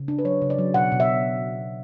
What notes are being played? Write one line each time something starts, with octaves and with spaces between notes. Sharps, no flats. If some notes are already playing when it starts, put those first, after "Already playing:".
Already playing: C#3
D4
B4
F#3 C#5
C#3
D5
F#3
B2 F#5
B2
E5